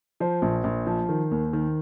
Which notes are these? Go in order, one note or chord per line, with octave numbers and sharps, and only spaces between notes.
F3 C5
A#1
A#1
F3
D#3
D#2
D#3